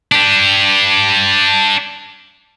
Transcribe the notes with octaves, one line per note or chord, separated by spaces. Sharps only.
D4 G4